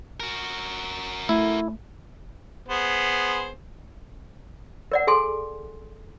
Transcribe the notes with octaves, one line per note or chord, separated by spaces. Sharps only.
F#4 A#4
A3 E4
B3 G#4 C5
A#4 D5 F#5
G#4 A4 G#5 C6